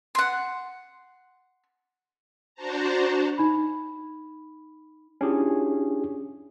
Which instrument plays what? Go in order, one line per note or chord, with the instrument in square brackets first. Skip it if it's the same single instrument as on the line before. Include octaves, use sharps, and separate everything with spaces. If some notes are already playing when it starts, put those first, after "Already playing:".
[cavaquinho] F#5 C6
[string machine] D4 F#4 C5 A5 A#5
[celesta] D#4 B5
[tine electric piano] C#4 D4 E4 F4 G4 G#4